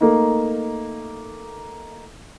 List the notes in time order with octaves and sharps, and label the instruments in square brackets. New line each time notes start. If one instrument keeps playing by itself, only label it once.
[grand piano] A3 A#3 D#4